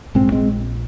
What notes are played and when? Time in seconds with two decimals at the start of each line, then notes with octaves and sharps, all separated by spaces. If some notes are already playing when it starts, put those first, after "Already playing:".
0.15 A#1 G#2 G#3 C4
0.32 G#3 C4